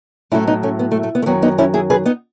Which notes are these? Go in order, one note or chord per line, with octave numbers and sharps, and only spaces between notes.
A2 F#3 A3 C#4 E4
B3 D#4
A3 C#4
B3
A3
A3
B3
A3
F#2 D#3 F#3 B3
B3 D#4
C#4 E4
E4 G#4
G#4 B4
B3 D#4